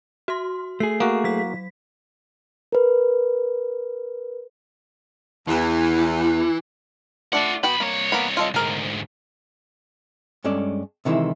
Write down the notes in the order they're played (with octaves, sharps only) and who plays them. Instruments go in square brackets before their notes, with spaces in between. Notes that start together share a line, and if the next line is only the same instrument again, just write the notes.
[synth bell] F#4 C6
[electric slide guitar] A3 G#4 [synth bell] C7
[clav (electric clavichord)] A#3 F#4 [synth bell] F5
[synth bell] F#3 B6
[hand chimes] A#4 B4
[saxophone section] E2 [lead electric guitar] E3
[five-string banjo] A3 D4 D5 [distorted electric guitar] F4 F#5
[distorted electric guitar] B1 B5 [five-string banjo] B3 F#4 G5
[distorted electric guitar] C2 C#5 [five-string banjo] A#3
[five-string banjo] A#3 B3 B5
F4 A4 D#5
[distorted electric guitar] D2 G#2 [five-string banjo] G#4 A#4
[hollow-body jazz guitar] G2 G#3 C#4 A4 D5
C3 D#3 E3 G#3 E4